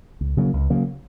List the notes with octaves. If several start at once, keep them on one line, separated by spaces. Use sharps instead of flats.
C#2
C#3 F#3 A#3
C#2
C#3 F#3 A#3